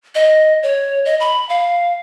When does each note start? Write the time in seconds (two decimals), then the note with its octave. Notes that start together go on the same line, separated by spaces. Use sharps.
0.15 D#5
0.63 C#5
1.05 D#5
1.20 B5
1.49 F5